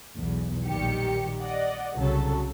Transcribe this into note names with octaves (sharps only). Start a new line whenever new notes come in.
B1 E2
A#1 D#3 G3 G4 C#7
D5 D#5 F#5
C2 C#3 F#3 A4